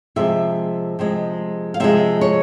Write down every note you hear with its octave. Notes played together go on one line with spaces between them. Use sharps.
C3 F3 G#3 E5
C3 F3 G#3
F5
C3 F3 G#3 E5
C#5